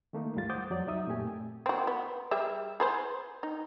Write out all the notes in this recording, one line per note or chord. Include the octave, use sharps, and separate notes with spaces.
D#3 A3 A#3 D#4
D2 G#2 G3 G#3 F4 A6
C5 F#5 D6 D#6 G6 A6
F2 F#3 D5
C2 F#3 D#4 E5 D#6
F#2 A#2 A3 C4 G4 G#5
C4 F#4
B3
G3 G#4 E5
G#4 B4 C5
D#4